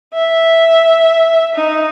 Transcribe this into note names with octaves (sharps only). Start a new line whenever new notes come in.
E5
D#4